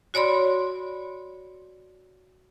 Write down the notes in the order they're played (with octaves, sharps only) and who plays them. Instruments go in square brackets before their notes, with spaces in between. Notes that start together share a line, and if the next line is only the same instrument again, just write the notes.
[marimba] F#4 C#5 D5 B5 C6